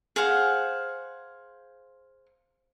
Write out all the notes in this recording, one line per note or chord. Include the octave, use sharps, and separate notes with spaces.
G#4 C5 F5 F#5